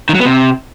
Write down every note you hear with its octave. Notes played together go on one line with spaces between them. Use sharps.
D#3
F#3
B3
C3